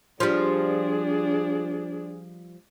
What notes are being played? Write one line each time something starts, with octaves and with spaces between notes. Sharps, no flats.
F3 G3 D4 G#4